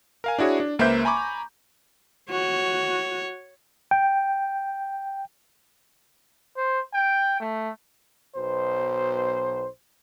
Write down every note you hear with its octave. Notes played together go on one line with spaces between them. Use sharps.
A#4 F5 G#5
D4 E4 F#4 G#4 C#5
D4
C#2 A#3 B4 C5 E5 G6
G#5 A#5 B5 C#6 D6
F#4 C#5
G5
C5
G5
A3
B1 B2 C5